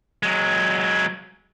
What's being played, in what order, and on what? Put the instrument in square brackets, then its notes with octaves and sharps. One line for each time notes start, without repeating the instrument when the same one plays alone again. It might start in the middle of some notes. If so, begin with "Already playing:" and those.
[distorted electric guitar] F#3 G#3